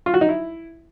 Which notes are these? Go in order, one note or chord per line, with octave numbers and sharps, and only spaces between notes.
F4
F#4
D#4
E4